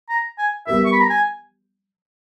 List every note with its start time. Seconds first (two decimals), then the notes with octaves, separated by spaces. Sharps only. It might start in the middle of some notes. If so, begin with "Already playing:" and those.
0.10 A#5
0.38 G#5
0.67 G3 B3 G4 A#4 E5
0.85 C#6
0.93 B5
1.01 A#5
1.10 G#5